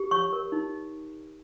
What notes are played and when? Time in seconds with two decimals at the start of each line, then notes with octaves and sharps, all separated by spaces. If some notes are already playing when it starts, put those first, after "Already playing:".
Already playing: G4
0.11 C#5 C#6
0.33 A#4
0.52 D#4